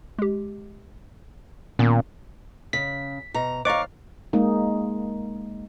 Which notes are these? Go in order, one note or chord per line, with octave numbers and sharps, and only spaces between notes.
G#3 G4
A#2 D#3 B3 C#4
C#3 B6
B2 A#5
D#2 C5 D#5 F5 A#5 C#6 D6
G#3 A#3 D#4